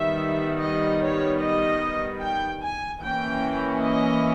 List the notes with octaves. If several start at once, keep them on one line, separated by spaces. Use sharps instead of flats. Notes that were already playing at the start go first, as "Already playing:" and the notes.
Already playing: D#3 G3 B3 E5
D#5
C#5
D#5
G5
G#5
E3 A#3 C#4 G5
D#5